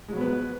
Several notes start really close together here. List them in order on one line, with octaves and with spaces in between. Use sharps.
G#3 F#3 B3 B4